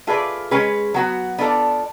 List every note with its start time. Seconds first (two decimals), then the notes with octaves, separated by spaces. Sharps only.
0.07 A3 F4 G#4 B4 D5
0.51 G#3 C#4 G#4 B4
0.94 F#3 B3 F#4
1.38 B3 D4 F4 A4 D5